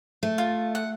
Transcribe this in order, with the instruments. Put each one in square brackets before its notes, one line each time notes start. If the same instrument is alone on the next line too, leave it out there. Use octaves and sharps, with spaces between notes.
[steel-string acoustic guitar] A3
[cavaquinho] F4
F#5